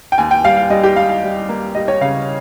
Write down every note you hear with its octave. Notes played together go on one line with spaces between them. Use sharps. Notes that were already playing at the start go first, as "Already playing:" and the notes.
G5
D#2 G#5
G5
G3 F5
F5
G3 D#5
G4
G3 F5
F5
G3
A#3
G3 D#5
C#5
C#3 F5